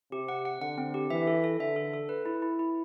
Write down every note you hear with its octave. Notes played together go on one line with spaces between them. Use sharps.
C3 G4
F#5
F#5
D3 F#5
C4
G4
E3 E5
A4
A4
D3 E5
A4
A4
B4
E4
E4
E4